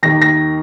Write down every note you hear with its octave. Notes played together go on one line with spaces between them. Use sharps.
D#2 D#3 A#6
A#6